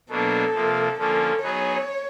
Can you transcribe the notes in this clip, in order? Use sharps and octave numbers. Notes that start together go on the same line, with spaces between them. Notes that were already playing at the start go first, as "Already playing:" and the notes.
B2 F#3 A#3 D4 A4
C3 F3 A#3
D3 F3 A#3 C#4 A4
F#3 B3 D#4 G#4 B4 C#5